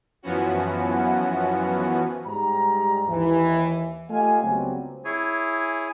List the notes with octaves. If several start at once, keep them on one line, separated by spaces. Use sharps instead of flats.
F#2 E3 F3 B3 C#4 F#4
G#2 G3 A#5
D#2 E3
A3 F4 G4 D#5 F5 G#5
C#2 F#3 G3 B3 C4
E4 G#4 C#5 G#5